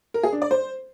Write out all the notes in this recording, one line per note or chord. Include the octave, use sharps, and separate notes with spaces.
A#4
G#4
D4
D5
C5